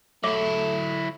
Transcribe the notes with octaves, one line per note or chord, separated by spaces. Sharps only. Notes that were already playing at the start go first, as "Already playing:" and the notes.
F#3 A3 E4 C#5 E5 D6